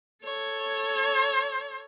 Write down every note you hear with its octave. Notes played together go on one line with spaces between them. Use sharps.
A4 C#5